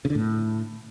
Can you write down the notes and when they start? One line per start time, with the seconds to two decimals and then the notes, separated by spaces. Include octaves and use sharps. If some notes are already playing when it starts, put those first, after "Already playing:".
0.05 C#3
0.10 D3
0.15 A2